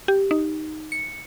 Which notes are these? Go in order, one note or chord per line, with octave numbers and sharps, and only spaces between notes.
G4
D#4
C#7